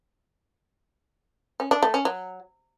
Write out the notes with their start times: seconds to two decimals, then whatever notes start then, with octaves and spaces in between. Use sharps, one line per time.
1.60 C#4
1.71 D4
1.83 A3
1.94 C#4
2.05 F#3